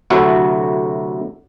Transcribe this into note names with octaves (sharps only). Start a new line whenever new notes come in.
D2 C3 F#3 E4 F#4 A4